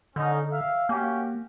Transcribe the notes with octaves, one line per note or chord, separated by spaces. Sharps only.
D3 C#4 D#4
E5 F5
A#3 C#4 F#4 G4